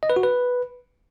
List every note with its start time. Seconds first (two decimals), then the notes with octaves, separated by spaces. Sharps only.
0.03 D#5
0.10 B4
0.16 F#4
0.23 B4